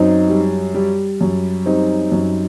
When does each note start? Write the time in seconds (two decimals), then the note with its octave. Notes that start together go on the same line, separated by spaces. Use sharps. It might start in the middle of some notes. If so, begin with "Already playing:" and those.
Already playing: F#2 C4 D#4
0.29 G3
0.74 G3
1.21 F#2
1.66 G3 C4 D#4
2.12 F#2